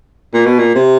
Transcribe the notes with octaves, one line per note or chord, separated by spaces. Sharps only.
A#2
B2
A#2
C3